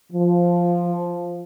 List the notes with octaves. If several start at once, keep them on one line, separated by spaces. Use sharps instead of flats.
F3